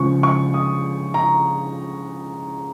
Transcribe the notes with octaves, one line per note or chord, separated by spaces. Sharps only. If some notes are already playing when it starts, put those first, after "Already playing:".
Already playing: C#2 C#3 F3 G#3 C#6
C#6
D#6
A#5